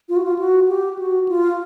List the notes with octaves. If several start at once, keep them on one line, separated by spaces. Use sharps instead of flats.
F4
F#4
F4
F#4
G4
F#4
F4